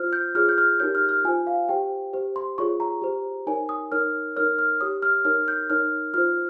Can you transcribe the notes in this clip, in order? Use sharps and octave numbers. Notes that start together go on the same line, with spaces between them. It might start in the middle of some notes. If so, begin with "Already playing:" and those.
Already playing: F4 C5 F6
G6
F4 G#4 C#5 F6
G6
F6
D#4 G4 A#4 C#5 G6
F6
F6
F4 C5 G#5
F5
G4 C5 G5
G4 C5
C6
F4 G#4 C#5 C#6
A#5
G4 C5
D#4 A#4 C#5 G#5
D#6
D#4 A#4 C#5 F6
D#4 A#4 C#5 F6
F6
G4 C#5 D#6
F6
D#4 A#4 C#5 F6
G6
D#4 A#4 C#5 F6
F4 C5 F6